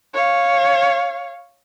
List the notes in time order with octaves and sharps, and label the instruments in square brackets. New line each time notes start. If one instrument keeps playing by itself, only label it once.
[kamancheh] C#5 F5